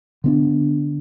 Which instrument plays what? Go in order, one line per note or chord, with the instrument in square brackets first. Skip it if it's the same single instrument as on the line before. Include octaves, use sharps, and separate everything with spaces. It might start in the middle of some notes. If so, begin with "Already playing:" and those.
[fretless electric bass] D3 B3 D4